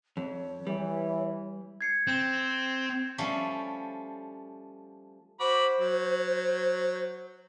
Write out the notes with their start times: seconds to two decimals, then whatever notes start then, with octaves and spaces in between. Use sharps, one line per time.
0.17 F2 C#5
0.67 E3 G3
1.81 G#6 C7 C#7
2.07 C4 G6 E7
3.18 F3 G3 A3 C#4
5.40 F#4 C5 B5 D6
5.80 F#3